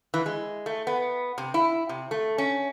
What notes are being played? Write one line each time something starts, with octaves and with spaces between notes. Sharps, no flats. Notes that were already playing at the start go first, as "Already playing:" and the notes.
E3
G#3
A3
B3
C3
E4
C3
A3
C#4